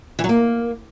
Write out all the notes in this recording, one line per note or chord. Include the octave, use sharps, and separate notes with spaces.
E3
F#3
A#3